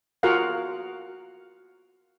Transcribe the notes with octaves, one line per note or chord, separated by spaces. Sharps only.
F4 F#4 G#4 A#4 F5 F#5